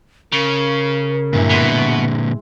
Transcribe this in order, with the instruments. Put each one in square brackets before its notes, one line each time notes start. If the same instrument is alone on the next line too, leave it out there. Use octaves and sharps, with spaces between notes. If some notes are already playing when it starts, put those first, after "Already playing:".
[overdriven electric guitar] C#3 [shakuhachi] A#4
[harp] G2 G#3 E4 [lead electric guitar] A#2 D3
[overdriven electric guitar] B2 [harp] C6 F#6 G#6